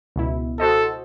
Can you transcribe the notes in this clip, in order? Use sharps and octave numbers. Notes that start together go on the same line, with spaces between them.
C#2 B2 E4
F#4 A4 C5 D#5